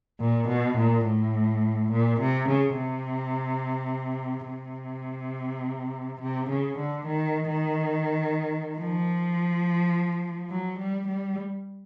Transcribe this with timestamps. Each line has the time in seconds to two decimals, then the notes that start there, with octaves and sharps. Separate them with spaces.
0.20 A#2
0.48 B2
0.77 A#2
1.06 A2
1.92 A#2
2.20 C3
2.49 C#3
2.77 C3
4.49 C3
6.21 C3
6.49 C#3
6.78 D3
7.06 D#3
7.50 D#3
8.78 F3
10.50 F#3
10.79 G3
11.07 G3